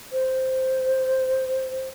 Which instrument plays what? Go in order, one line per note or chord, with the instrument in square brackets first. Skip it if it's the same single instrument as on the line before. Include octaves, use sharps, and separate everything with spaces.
[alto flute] C5